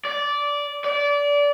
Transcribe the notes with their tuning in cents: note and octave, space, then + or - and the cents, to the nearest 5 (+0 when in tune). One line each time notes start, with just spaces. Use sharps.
D5 -15
D5 -25